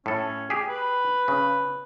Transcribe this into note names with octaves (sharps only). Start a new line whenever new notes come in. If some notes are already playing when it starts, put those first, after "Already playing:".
A2 C#4 A4
G4 G#4
B4
C#3